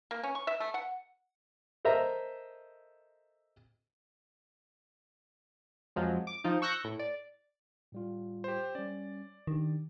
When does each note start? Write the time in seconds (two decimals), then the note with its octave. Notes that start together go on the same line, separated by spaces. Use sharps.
0.11 A#3
0.23 C#4
0.35 C#6
0.47 E5
0.60 A3
0.74 F#5
1.85 A4 A#4 C5 D#5 E5 A#5
5.96 F2 F3 F#3 G#3
6.27 D6
6.44 F3 D#4
6.62 C#6 E6 F#6 G6 A#6
6.84 A2
6.99 D5
7.92 A2 G3 F4
8.44 G4 C5
8.75 G3 C#4 D5
9.47 D#3 D4 G4